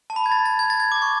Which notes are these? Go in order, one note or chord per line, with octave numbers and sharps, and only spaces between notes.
A5
B5
G#6
A6
A6
G#6
A6
G#6
D6
C#6